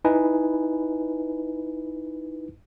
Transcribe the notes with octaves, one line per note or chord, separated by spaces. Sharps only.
D#4 E4 B4 G#5